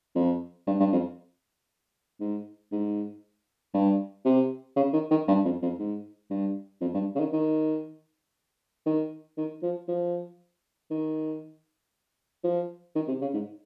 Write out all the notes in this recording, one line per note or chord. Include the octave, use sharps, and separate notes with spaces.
F2
G2
G2
F2
G#2
G#2
G2
C3
C#3
D#3
D#3
G2
F2
F2
G#2
G2
F2
G2
C#3
D#3
D#3
D#3
D#3
F3
F3
D#3
F3
D#3
C3
C#3
G#2